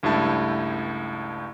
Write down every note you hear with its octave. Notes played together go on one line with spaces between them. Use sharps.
C#2 G2 A3 E4 A5